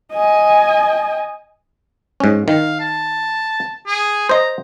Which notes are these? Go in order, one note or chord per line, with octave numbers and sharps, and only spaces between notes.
D#5 G#5
G#2 C#4
D#3 F5
A5
G#4
C5 D#5 A#5